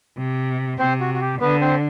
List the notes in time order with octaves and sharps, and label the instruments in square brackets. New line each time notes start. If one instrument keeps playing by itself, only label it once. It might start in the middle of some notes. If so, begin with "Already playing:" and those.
[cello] C3
[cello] C3 [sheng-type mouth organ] C4 C5
[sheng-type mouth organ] F#4
F#4
G4
[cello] D3 [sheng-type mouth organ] B3 B4
[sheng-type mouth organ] C4 C5